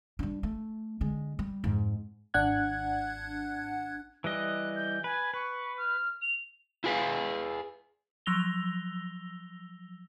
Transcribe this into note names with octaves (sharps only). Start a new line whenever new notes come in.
G3 D4
A3
D3 G#3
G3
F2 G#2
G#1 D4 F#5 F#6 G#6
E3 G3 D#5 F#6
G6
B4 G#5
B4 C#6
F6
F7
E4 F4 G#4 B4 E5 F5
F3 F#3 E6 A#6 F7 G7